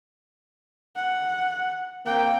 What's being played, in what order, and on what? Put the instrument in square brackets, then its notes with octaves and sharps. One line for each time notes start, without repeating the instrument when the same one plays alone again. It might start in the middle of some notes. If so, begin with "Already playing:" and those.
[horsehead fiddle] F#5
[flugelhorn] A#3 [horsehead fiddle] C4 G5